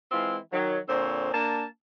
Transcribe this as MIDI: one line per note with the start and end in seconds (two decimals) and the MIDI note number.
0.11 0.37 52
0.11 0.37 56
0.11 0.37 60
0.11 0.37 64
0.11 0.37 65
0.52 0.77 51
0.52 0.77 54
0.87 1.28 46
0.87 1.28 50
0.87 1.28 60
0.87 1.28 72
0.87 1.28 73
1.32 1.64 58
1.32 1.64 62
1.32 1.64 81